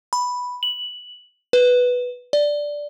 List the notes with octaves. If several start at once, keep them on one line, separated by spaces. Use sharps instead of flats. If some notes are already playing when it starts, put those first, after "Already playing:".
B5
F#7
B4
D5